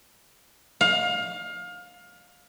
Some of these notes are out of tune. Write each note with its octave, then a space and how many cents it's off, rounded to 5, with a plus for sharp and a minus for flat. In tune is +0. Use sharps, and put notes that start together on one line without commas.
F5 +25